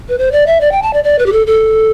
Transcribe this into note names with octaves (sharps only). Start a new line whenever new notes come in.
B4
C5
D5
E5
D5
G5
A5
D5
D5
B4
G4
A4
A4